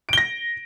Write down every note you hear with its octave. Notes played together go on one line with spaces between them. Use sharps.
A#6 D7 G7